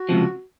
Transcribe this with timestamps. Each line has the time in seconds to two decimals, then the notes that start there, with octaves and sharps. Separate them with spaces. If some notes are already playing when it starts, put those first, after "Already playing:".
Already playing: F#4
0.09 C#2 C3 F3